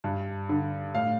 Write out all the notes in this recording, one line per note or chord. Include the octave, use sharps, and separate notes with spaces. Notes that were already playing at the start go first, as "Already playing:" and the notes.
G2
D3
A2 F5